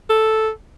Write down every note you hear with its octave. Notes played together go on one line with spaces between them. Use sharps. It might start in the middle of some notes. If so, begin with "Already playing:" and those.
A4